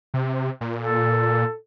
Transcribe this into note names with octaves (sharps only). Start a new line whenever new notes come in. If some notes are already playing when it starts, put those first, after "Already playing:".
C3
A#2
A4